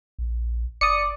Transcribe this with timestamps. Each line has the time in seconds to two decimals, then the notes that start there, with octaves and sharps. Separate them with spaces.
0.19 A#1
0.81 F#1 D5 D#6 C#7